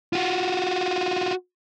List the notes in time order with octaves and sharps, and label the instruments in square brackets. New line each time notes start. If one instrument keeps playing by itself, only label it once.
[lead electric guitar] F4 F#4